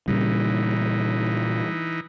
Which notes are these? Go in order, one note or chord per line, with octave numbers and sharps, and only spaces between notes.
A#2 C#3 E3 G3 D#4